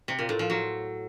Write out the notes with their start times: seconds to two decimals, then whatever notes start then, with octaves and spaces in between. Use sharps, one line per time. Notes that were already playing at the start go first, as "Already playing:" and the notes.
0.08 C3
0.19 A#2
0.29 A2
0.39 F3
0.50 F#3